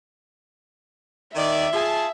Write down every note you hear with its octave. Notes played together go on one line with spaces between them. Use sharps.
D#3 D5 E5
F4 G#4 A5